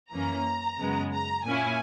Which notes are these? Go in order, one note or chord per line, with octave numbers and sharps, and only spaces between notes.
F#2 E3 A#3 C#4 A#5
F#2 C#3 G#3 B3
A#5
A#2 A#3 C#4 E4 G#5